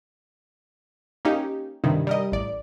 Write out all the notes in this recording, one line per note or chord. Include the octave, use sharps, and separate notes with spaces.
A#3 C#4 D#4 G4
G2 C3 D#3
G3 A#4 D#5
A1 D5